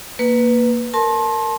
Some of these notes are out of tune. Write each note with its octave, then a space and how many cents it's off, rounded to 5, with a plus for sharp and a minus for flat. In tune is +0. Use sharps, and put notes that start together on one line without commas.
A#3 +0 B4 +0
A#4 -15 A5 -20 C6 +30